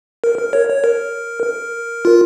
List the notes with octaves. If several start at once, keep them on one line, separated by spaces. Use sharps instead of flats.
A#4
A#4
C#5
C#5
A#4
A#4
F4